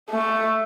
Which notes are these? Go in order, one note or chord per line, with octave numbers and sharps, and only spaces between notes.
A3